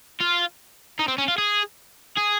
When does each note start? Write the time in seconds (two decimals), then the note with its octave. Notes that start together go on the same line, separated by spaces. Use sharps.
0.20 F4
0.99 D#4
1.08 C4
1.18 C#4
1.28 F4
1.38 G#4
2.17 G#4